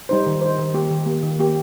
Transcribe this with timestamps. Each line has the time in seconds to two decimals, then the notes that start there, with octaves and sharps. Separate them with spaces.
0.09 G3 D#4 C5
0.26 D#3
0.41 G3 D#4 C5
0.59 D#3
0.74 A#3 G4
0.91 D#3
1.06 A#3 G4
1.22 D#3
1.39 A#3 G4